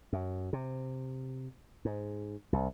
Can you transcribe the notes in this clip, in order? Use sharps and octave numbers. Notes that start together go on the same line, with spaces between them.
F#2
C3
G#2
C2